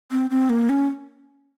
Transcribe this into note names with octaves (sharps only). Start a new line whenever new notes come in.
C4
C4
A#3
C#4